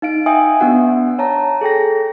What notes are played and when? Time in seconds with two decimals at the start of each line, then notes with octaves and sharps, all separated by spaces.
0.02 D#4 F5 D7
0.26 E5 G5 G#5 D#6
0.60 B3 D4 F#4 F#5
1.19 C#5 A5 A#5
1.61 G#4 A4 G5 A#6